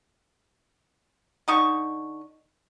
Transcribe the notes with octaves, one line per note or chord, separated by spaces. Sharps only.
D3 D#4 C#6